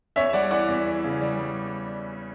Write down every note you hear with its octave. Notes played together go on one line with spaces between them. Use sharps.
E2 C#5 E5
G3 D5 F#5
E3 D5 F#5
E2
E3
C#3
G3
G3